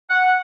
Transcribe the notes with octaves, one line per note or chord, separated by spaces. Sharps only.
F#5